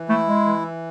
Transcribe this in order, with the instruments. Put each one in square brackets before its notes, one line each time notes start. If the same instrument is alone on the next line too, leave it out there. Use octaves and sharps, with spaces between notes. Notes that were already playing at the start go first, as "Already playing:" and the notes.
Already playing: [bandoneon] E3
[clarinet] A3 [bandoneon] E4
[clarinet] G#3
[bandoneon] E3